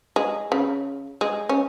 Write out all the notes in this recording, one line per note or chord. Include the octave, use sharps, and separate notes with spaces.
G#3
C#3
G#3
C#4